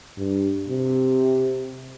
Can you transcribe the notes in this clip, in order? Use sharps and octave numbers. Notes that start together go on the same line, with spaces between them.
G2
C3